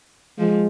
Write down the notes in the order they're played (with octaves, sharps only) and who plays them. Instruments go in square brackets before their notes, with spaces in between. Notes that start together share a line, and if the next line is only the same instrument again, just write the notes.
[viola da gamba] F3 [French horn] G#3